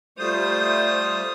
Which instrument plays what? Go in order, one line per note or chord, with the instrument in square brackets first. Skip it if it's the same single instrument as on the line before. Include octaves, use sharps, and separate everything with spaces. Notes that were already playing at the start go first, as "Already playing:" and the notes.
[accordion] G3 A3 C5 [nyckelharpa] F4 D#6